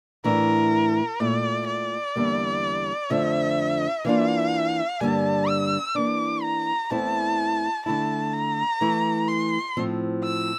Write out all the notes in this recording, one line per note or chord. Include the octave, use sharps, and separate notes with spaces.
A2 E3 A3 D4 A#4
A#2 A3 E4 D5
D5
E2 D3 G3 A#3
F2 D3 F3 A3 D4 E5
E3 A#3 D4 F4 F5
G2 D3 G3 A#3 A5
E6
E3 A#3 D4 D6
A#5
E2 E3 A3 C4 E4 A5
D3 A3 E4 A5
A#5
E3 A3 E4
C6
A2 F3 C4
E6